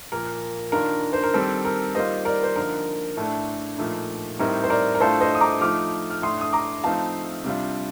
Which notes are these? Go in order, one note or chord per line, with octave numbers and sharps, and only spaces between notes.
A#2 F3 A#3 A#4
D#3 A#3 D4 F4 A#4
C5
A#4
D#3 G3 C4 A4
A#4
D#3 G3 A#3 F4 C5 D#5
A#4 D5
C5
D3 F3 A#3 D#4 A#4
A2 A3 D4 A4
A#2 F3 A3 D#4
A2 G3 C4 D#4 A#4
C5
A#4 D5
A#4
A2 A3 D4 F4 A4 C5
C5 D#5
D#6
A#5 D6
F3 A3 D#4 D6 F6
F6
A2 A3 D4 C6 D#6
D#6
A#5 D6
F3 A3 C4 D#4 F5 A5
C3 G3 D4 F4